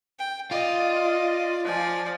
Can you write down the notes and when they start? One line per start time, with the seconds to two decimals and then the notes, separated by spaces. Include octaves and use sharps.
0.19 G5
0.51 F4 D5 D#5
1.64 F3 D5 G#5